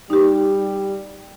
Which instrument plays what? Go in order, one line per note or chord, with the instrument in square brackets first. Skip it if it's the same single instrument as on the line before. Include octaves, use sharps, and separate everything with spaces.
[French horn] G3 [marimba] D#4 G4